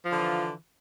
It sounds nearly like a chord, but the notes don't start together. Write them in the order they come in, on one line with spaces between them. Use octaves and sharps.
F3 D3 E3 F4